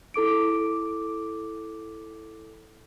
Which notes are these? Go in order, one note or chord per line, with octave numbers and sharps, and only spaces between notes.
E4 A4 D6 D7